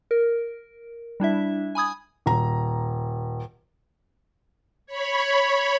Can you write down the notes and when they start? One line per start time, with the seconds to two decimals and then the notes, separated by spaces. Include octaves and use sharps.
0.11 A#4
1.20 G3 D4 E4 E5
1.75 G#5 B5 D#6 G#6
2.26 D#1 A#5
4.87 C#5 B5